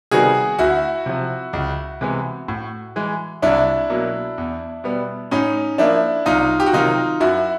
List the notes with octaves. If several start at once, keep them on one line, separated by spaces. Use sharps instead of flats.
C3 D#3 G3 B3 F#4 G#4
D2 E4 F#4
C3 F3
C#2
C3 E3 G#3 B3
A2
E3 G#3
C2 D4 E4
B2 F#3 A#3
E2
B2 G3 B3
A2 C#4 D#4
F3 A#3 D4 E4
C2 D#4 F4
G4
F#4
C3 D#3 F#3 D#4 F4
F#2 E4 F#4